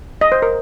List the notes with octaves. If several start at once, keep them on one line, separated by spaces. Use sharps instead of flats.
D#5
C5
A#4